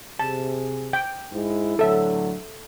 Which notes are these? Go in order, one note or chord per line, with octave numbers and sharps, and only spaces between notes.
C3 G#4 A5
G5
G#2 G#3 E4
A2 D3 F#3 A4 E5